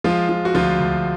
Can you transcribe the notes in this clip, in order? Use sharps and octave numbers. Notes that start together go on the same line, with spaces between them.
F3 G#3 F4
F3
F#4
D2 F3 F4
D2